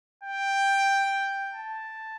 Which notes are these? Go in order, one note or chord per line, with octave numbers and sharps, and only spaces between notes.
G5
A5